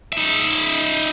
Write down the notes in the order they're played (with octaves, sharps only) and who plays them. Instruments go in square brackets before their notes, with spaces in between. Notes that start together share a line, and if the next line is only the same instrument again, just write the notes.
[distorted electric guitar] D#4 E5